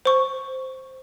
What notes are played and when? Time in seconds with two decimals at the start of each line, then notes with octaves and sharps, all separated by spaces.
0.05 C5 C#6